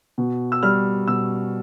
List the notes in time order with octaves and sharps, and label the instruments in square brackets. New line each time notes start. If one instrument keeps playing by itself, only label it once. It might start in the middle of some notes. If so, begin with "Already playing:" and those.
[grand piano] B2
E6
G3 F6
B2 E6